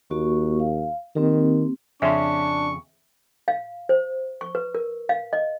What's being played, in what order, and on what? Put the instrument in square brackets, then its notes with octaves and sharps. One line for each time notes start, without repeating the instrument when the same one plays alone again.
[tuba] D#2 [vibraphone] A#3 F#4 C#6
[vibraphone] F5
[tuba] D#3 [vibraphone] A#3 C4 G4
[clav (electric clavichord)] F2 C#3 C#4 [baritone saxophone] D4 [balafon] E5 C6 [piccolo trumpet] C#6
[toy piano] F5
C5
C#6
B4
A#4
F5
D#5